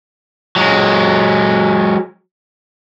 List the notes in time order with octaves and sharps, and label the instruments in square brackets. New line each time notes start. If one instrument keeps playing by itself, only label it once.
[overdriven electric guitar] F#3 G#3